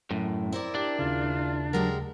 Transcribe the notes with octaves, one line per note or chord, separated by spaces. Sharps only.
F#2 A2
C4 E4 A#4 D5
D4 G4
D#2 C#3 F4
F#3 G#3 G4 A#4